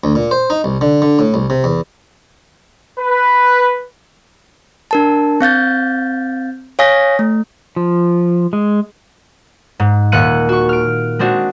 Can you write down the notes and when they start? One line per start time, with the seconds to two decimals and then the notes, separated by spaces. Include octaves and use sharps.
0.04 D2
0.15 A#2
0.31 C5
0.50 D#4
0.64 C2
0.81 D3
1.02 D3
1.19 A2
1.34 C2
1.50 C3
1.64 E2
2.98 B4
4.91 D4 A#4 A5
5.41 C4 F5 G6 A6
6.79 C#5 F5 G#5 D#6 A#6 B6
7.19 A3
7.76 F3
8.53 G#3
9.80 G#2
10.12 D#1 A#2 F#6 C#7 D#7
10.49 F#4 C#6
10.69 F6 D7
11.19 G#3 C4 D4 F#4